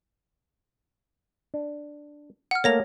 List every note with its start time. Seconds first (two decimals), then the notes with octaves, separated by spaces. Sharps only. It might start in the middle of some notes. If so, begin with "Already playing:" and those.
1.54 D4
2.51 F#5 F6
2.64 A3 A#3 C#5 A#6 F7